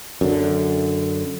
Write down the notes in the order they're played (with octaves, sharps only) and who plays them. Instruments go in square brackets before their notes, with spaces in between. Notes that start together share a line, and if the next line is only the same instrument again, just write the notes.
[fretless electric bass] F#2 D3